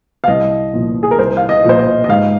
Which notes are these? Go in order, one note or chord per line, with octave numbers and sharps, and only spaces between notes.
F5
C2 D#5
A#2 F3
G#4
A#4
C2 C5
F5
D#5
A#2 F3 C5
D#5
D#5
G#2 F5